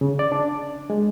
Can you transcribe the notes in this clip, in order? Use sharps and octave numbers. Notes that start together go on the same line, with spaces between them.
C#3
D5
D4
G#3